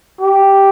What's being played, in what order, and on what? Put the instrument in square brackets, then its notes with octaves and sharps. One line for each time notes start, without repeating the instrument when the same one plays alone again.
[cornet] G4